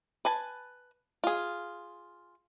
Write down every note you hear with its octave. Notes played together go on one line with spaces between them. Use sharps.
B4 G#5 A5
F4 G#4